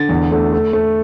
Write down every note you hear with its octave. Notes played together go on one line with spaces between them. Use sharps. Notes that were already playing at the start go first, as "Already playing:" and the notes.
Already playing: D3 A6
E2
A3
A3
A3